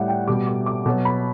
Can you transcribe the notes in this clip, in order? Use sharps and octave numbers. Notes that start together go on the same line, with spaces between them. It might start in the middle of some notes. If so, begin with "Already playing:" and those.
Already playing: A2 G3 D5 F#5
G5
B2 G3 D6
D6
D6
B2 F#3
B5